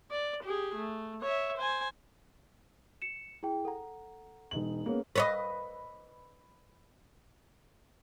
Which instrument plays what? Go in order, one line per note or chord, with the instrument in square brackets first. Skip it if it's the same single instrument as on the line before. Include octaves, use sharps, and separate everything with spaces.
[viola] D5
G4 G#4
A3
C#5 E5
C5 G#5
[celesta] C#7 E7
E4 G#4 G5
A4 F#5 A#5
[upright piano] E1 D#4 F#7
[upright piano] A#3 B3 C#4 [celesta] G#4
[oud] B4 C#5 D#5